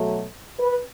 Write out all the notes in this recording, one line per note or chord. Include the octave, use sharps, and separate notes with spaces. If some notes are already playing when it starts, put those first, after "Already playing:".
Already playing: B2 F#3 A3
B4